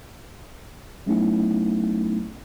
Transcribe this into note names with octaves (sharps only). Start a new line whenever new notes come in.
F#3 A3 B3 C#4 D#4 E4